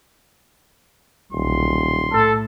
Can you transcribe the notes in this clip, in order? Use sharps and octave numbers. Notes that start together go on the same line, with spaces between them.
D#1 B1 C6
A2 A4